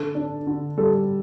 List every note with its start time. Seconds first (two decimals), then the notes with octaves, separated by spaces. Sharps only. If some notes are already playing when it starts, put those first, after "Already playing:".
Already playing: D3 A4
0.15 D4
0.47 D3
0.77 G3 A4